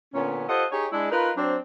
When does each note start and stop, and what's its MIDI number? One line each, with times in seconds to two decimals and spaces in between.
0.14 0.47 46
0.14 0.47 50
0.14 0.47 59
0.14 0.47 61
0.49 0.65 65
0.49 0.65 67
0.49 0.65 69
0.49 0.65 72
0.49 0.65 75
0.49 0.65 78
0.72 0.86 63
0.72 0.86 67
0.72 0.86 68
0.72 0.86 73
0.92 1.10 56
0.92 1.10 62
0.92 1.10 64
1.11 1.31 63
1.11 1.31 65
1.11 1.31 70
1.11 1.31 71
1.37 1.57 54
1.37 1.57 60
1.37 1.57 62